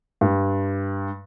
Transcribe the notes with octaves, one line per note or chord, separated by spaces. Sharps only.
G2